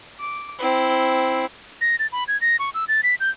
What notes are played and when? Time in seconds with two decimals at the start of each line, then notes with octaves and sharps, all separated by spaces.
0.20 D6
0.59 C4 E4
1.81 A#6
1.99 A6
2.12 B5
2.28 G#6
2.41 A#6
2.59 C#6
2.74 E6
2.88 A6
3.03 B6
3.20 G6